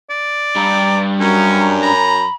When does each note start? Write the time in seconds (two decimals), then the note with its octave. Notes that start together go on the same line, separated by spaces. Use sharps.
0.10 D5
0.56 G2 G3 A#5
1.20 F#2 C#4 A#5
1.82 A#5 B5